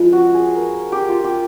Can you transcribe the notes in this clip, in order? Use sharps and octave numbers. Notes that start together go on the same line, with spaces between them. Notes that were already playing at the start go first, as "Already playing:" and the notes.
Already playing: F3 G#3 C#4 B4
F#4
G#4
A#4
G4
F4
G4